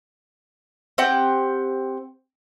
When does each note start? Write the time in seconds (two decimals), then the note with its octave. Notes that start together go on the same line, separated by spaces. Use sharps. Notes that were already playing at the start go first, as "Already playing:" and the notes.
0.98 C4 G4 F#5 G5